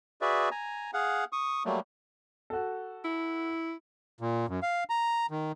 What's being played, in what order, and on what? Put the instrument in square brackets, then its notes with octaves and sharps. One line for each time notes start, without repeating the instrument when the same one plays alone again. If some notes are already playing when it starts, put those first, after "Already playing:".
[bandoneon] F#4 G#4 B4 D5 E5
G#5 A#5
G#4 F5 F#5
C#6 D#6
F#3 G3 A3 A#3
[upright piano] F#4 A4
[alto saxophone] E4
[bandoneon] A#2
F#2
F5
A#5
D#3